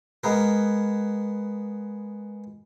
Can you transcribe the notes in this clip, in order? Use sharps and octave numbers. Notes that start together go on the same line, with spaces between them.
G#3 B3 A#4